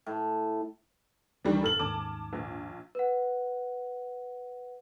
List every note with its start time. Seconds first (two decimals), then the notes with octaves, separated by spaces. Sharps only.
0.06 A2
1.45 C#2 D#3 E3 G3 D4
1.63 A#1 F#2 A4 F6 F#7
1.79 D#2 G#2 C#4 A5 D6
2.33 A#1
2.95 B4 F#5